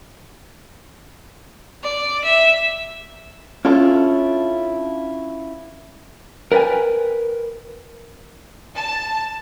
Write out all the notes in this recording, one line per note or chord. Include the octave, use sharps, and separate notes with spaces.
D5
E5
C#4 D4 E4 F4 A4
A#4 B4 D5 G5 G#5
A5